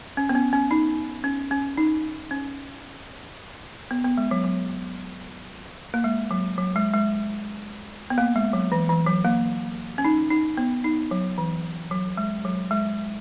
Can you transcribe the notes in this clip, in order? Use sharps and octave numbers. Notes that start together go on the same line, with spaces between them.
C#4
B3
C#4
C#4
D#4
C#4
C#4
D#4
C#4
B3
B3
G#3
F#3
F#3
A#3
G#3
F#3
F#3
G#3
G#3
B3
A#3
G#3
F#3
E3
E3
F#3
A#3
C#4
D#4
D#4
B3
D#4
F#3
E3
F#3
G#3
F#3
G#3